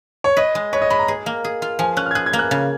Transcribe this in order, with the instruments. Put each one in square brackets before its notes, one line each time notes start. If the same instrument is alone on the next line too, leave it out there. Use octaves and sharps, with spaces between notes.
[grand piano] C#5
[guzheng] B4 [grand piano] D#5
[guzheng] G#3
[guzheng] B4 [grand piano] C#5
[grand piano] D#5
[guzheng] G#3 [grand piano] B5
[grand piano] A#5
[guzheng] G#4
A#3
G#4
F4
[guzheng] F3 [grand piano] G#5
[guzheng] C#4 [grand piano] F#6
[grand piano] F6
G#6
[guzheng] G#4 [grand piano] F#6
[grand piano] G#6
[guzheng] A#3
[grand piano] F#6
[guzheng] C#3